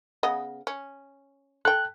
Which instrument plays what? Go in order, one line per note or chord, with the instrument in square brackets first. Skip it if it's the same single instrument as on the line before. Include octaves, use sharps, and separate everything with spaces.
[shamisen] C#3 B3 D#5
C#4
[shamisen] A4 G5 [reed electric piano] F#6